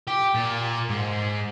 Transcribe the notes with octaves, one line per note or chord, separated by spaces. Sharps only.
G4
A#2
G#2